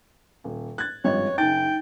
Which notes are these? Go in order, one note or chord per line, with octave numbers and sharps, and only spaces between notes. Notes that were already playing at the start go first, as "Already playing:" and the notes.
D#1
F#6 G#6 A6
G#1 G2 F3 C#4 C#5 D#5
F#1 D4 D#4 G5 A6